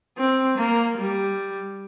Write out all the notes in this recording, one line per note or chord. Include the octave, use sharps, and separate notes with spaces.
C4
A#3
G3